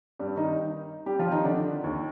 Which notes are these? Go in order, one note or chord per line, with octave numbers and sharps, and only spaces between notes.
G2 G3
D#3 D#4
G3 G4
F3 F4
D#3 D#4
D3 D4
D#2 D#3